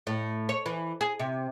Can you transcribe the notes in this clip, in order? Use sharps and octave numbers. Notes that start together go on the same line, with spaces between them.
A2
C#5
E3
G#4
C3